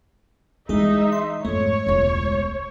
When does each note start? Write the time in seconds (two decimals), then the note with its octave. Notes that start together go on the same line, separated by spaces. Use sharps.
0.69 E3 G#3 D#4 E4 G#4 E5
1.12 C6
1.45 F2 G#2 A3 C#5
1.86 E1 C#2